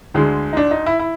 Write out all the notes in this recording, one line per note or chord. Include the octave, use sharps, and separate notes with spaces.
D2 D3 G#3
D#4
D4
D#4
E4
E4